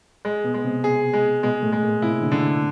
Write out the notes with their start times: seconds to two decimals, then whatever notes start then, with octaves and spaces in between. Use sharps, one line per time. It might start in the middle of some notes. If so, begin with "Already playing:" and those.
0.25 G#3
0.44 B2 B3
0.54 G#3 B3
0.64 C3 C4
0.84 G#4
1.13 G#3
1.43 B2 G#3 B3
1.63 A2 A3
1.72 G#3
1.83 A#2 A#3
2.02 C3 C4 E4
2.21 D3 D4
2.32 D3